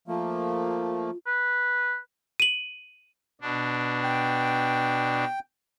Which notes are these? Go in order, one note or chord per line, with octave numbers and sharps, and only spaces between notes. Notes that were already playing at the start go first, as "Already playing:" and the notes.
F3 A3 A#3 F4
B4
D#7 F#7
B2 D4
G5